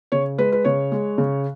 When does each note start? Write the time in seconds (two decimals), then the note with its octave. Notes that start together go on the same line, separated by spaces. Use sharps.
0.12 C#3 C#5
0.38 G#3 B4
0.52 B4
0.64 C#3 C#5
0.92 G#3
1.18 C#3